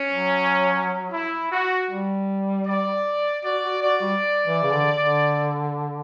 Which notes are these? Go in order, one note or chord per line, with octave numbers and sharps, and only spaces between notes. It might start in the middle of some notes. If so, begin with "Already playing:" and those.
Already playing: C#4
F#3
E4
F#4
G3
D5
F#4 D5
F#4
F#4 D5
G3
E3
C#3
D3
D3